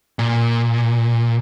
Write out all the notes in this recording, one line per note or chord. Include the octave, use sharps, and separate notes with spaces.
A#2